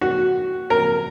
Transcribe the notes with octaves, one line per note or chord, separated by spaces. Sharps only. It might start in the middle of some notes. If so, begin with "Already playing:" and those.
F#4
A#4